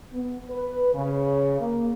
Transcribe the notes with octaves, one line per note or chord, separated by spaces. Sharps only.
B3
B4
C#3
A#3